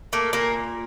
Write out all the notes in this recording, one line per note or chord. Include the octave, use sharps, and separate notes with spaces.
A3 A#3
A#2 A#3